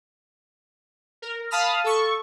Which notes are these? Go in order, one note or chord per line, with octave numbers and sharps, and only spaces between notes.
A#4
F5 A5 B5 D#6 F6
A4 C#6